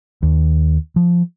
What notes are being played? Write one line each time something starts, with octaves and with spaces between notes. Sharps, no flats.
D#2
F3